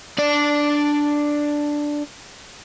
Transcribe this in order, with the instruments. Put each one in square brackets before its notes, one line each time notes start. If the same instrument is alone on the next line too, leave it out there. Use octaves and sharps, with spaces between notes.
[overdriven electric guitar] D4 D5